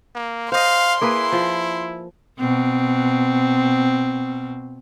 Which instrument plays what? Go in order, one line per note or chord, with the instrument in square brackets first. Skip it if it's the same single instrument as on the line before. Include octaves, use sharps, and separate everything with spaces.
[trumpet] A#3
[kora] C5 D#5 [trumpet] F5 [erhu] C6
[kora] A#3 G#4 B4 [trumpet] E4
[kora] F3
[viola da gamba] B2 C4